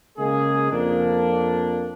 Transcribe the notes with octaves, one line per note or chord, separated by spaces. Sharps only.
C#3 G#3 A#3 G#4
F2 A#3 D4